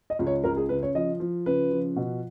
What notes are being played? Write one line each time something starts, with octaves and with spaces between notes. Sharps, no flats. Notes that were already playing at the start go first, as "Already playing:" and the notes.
D#5
C#2
C#5
C#2 A#4
G#4
C#3 B4
C#5
F3 D#5
F3
C#3 B4
F3
B2